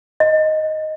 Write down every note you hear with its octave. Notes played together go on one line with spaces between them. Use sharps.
D#5